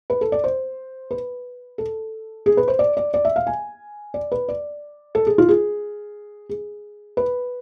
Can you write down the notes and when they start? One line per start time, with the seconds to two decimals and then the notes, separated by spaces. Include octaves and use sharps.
0.10 B4
0.21 A4
0.32 D5
0.44 C5
1.11 B4
1.78 A4
2.46 G#4
2.57 B4
2.68 C5
2.79 D5
2.97 D5
3.14 D5
3.25 E5
3.36 F5
3.47 G#5
4.14 D5
4.32 B4
4.48 D5
5.15 A4
5.27 G#4
5.38 F4
5.49 G#4
6.49 G#4
7.17 B4